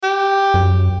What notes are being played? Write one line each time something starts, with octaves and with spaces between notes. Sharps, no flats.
G4
F#2